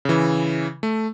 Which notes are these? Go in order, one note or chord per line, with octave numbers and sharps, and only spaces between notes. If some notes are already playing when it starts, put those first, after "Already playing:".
C#3 E3
A3